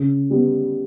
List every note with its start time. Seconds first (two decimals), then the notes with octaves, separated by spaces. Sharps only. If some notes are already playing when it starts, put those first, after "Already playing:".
Already playing: C#3
0.30 G3 B3